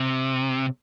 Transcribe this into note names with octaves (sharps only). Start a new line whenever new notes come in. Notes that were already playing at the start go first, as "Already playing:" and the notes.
Already playing: C3